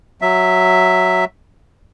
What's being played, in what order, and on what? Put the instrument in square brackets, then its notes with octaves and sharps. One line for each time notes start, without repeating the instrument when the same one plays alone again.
[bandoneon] F#3 E5